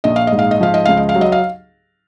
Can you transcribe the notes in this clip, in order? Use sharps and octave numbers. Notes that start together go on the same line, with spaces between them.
A#1 D#5
F5
G#2 D#5
F5
D#5
F3 F5
D#5
C#2 F5
D#5
F5
F#3
D#5
F5